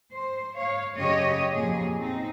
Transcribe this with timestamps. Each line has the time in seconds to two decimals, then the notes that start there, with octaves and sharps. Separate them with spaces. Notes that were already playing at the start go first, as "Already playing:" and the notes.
0.13 C5
0.57 C#5 F5
0.97 F#2 C#3 G4 C#5 D#5
1.53 F2 A#2 G#4
1.98 C4 D#4